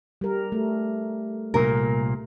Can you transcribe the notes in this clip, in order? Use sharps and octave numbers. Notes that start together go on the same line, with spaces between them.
G3 A#4
A3
C2 A#2 A#3 A#4